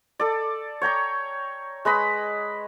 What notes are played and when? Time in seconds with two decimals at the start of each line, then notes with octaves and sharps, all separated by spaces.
0.19 A4 D5
0.81 C#5 G5 A#5 C#6
1.85 G#3 B4 D#5 B5